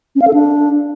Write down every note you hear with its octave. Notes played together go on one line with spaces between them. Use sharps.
C#4
F5
A4
D4